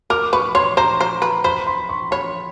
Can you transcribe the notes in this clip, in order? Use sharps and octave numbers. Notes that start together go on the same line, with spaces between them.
A#4 D6
B4 C#6
C#5 C6
C5 A#5
C5
B4
C5 B5
C6
C#6
C#5 B5